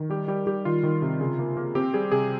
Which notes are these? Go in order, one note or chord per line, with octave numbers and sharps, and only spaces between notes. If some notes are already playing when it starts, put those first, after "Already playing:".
Already playing: D#3
G3 G4
G3 G4
G3 G4
D#3 F4
D#3
C3
C#3
A#3
A#3
C4 G4
G3 G#4
C3 G#4